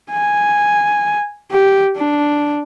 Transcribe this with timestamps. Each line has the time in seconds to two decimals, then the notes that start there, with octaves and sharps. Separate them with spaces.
0.11 G#5
1.51 G4
1.97 D4